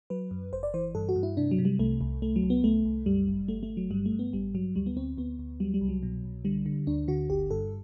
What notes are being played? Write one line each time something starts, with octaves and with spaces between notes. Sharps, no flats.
F#3 B4
F#2
G1 C5
D5
E3 C5
G2 A4
F#4
G2
E4
C3 D4
F#3
C3
G3
C2 A3
C2
C2 A3
F#3
C2
B3
C2 A3
C2
F#2 G3
G1
G1 A3
A3
G1
F#3
G2 G3
A3
G2
B3
A1 G3
G2 F#3
D2 G3
B3
D2 C4
D2 B3
D2
F#3 G3
G3
C2
F#3
B2
C2
D3 G3
D3
D2 D4
D3 F#4
G1 G4
G2 A4